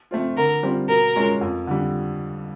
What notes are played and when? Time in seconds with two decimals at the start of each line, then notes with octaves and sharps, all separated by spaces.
0.11 F3 A3 C4 F4
0.37 D3 A#4
0.63 G3 C4 F4
0.89 B2 A#4
1.15 G#3 C#4 F4
1.41 F2
1.67 D3 G3